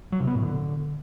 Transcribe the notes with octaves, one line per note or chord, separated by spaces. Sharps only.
F#3
C3
B3
A2
D3